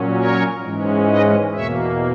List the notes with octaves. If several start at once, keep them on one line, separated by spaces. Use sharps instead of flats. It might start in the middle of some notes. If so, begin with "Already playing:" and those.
Already playing: A#2 F#3 C#4
A#4 C#5
G#2 E3 G#3 C#4
B4 D#5
E2 B2 A#3 C#5 E5